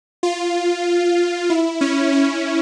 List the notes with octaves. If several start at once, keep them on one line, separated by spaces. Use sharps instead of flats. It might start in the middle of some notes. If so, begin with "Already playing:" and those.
F4
E4
C#4
C#4